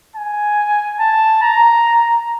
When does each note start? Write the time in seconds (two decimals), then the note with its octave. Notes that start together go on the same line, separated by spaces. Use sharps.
0.16 G#5
1.00 A5
1.43 A#5